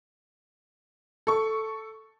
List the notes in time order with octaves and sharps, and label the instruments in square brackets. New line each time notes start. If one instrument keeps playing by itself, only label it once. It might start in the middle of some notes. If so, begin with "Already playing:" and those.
[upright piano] A4 C#6